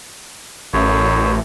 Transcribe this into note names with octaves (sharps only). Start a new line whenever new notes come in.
A1 F#2